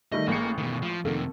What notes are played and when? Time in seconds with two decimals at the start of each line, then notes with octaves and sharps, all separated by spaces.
0.12 D#3 G3 A3 D#5
0.28 A1 G#3 A#3 C#7
0.58 B2 D#3
0.82 F3
1.05 F2 C3 D#3 A#3 A4